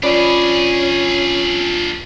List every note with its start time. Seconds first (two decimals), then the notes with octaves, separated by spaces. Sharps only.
0.03 C#4 D4 F4 G#4 B4 D5 D#5